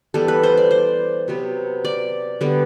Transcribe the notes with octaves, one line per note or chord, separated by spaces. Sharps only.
E3 G3 B3 A4
B4
C5
D5
C5
C3 F#3 B3
D5
D3 G3 B3